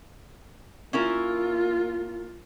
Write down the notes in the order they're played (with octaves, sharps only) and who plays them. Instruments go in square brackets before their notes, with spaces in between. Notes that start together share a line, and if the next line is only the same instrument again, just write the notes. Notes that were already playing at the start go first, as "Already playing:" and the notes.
[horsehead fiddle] A#3 F4 [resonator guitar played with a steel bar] C#4 E4 A#4